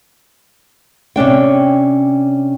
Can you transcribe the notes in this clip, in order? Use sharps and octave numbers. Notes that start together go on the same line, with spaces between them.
C3 C#4 D4 G5